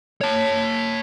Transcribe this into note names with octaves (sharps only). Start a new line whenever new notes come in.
C#5 A5